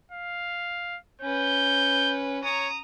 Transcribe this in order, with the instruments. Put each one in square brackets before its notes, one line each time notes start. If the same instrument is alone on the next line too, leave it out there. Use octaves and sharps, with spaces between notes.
[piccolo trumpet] F5
[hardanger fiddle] C#4 B4 [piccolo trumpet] G6
[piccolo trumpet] C#5 [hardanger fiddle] A#5 D#6